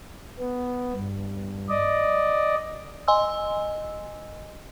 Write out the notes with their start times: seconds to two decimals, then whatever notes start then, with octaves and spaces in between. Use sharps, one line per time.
0.39 B3
0.93 G2
1.69 D5 D#5
3.08 D#5 G#5 C6 E6